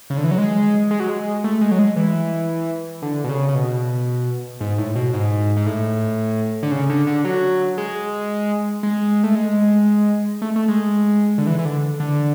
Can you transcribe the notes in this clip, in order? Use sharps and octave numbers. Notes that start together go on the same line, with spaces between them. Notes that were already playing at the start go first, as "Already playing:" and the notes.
C#3
D3
E3
F#3
G#3
G#3
F#3
G#3
A3
G#3
F#3
G#3
E3
D3
B2
C#3
C#3
B2
G#2
A2
B2
G#2
G#2
A2
D3
C#3
D3
D3
F#3
G#3
G#3
A3
G#3
A3
A3
G#3
D3
E3
E3
D3
D3